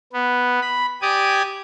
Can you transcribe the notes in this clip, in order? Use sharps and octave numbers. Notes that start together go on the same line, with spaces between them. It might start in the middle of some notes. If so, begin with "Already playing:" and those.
B3
B5
G4 D5 G#5 D6 D#6